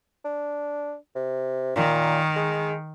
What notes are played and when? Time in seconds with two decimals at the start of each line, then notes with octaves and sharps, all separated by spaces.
0.25 D4
1.15 C3
1.76 A#2 D#3
2.36 G#3